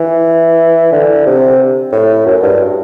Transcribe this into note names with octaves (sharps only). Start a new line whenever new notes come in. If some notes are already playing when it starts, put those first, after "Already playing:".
Already playing: E3
D3
C3
A2
F#2
G2